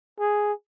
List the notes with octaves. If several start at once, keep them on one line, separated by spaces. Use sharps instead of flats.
G#4